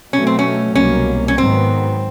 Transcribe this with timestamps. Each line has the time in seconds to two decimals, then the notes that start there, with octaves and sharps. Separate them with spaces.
0.13 B2 F#3 A3 C#4
0.27 C4
0.39 C#4
0.75 C2 B2 F#3 A#3 C#4
1.28 C#4
1.37 G#2 D#3 F#3 B3 C4